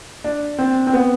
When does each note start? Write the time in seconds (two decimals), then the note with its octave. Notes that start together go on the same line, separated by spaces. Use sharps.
0.24 D4
0.59 C4
0.87 C4
0.93 B3